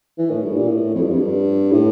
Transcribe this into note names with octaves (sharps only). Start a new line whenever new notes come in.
E3
A2
G2
A#2
A2
F2
G2
F2
G2
A2